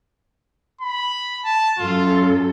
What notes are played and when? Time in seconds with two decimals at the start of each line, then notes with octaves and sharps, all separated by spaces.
0.81 B5
1.45 A5
1.79 F#2 F4 A4